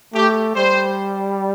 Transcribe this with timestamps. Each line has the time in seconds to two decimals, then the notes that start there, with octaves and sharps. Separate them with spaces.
0.14 A3 G4
0.56 G3 C5